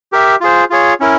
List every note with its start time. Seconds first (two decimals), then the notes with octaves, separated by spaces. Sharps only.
0.12 G4 A#4 E5
0.41 F4 G#4 C5
0.70 F4 G#4 C#5
1.00 C#4 E4 A#4